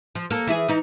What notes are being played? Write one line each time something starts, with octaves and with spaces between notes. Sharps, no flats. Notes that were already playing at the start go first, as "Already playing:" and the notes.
F3
A#3 A4
E3 E4 G#4
E3 D#4